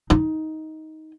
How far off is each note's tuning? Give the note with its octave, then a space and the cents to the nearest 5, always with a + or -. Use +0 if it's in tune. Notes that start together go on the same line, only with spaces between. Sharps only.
D#4 +15